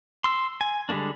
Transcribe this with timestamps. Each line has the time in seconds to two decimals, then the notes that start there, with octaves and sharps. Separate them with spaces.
0.24 C6 E6
0.61 G#5
0.89 D3 G3 G#3 A#3 D4